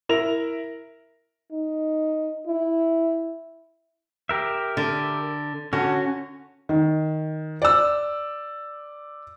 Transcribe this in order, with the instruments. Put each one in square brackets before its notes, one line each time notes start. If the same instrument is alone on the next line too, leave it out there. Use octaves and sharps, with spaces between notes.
[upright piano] E4 A#4 A#6 F7
[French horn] D#4
E4
[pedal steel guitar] G4 A#4 E5
[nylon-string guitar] D3
[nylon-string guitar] D3 [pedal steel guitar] C#4 F#4
[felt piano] D#3
D5 E6